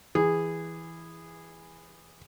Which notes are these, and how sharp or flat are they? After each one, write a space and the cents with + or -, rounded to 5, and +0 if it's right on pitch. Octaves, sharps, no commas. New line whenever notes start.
E3 +0 G#4 -15